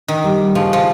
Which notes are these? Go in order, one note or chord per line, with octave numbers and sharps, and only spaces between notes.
D#3
G3
C#3 F3
F3